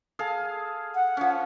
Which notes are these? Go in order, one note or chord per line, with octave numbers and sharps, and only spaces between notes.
G#4 A4 F5
F#5
F3 C#4